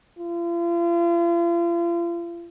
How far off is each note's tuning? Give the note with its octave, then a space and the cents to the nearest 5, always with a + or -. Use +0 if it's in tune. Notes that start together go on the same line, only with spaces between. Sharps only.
F4 -40